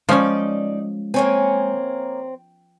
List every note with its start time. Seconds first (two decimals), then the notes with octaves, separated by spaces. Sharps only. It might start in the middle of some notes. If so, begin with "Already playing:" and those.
0.09 F3 G#3 C#4 D#4 D5
1.14 A#3 C4 C#5 G#5